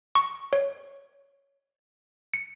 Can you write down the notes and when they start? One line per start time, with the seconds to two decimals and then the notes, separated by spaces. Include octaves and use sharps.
0.15 C#6
0.53 C#5
2.34 C#7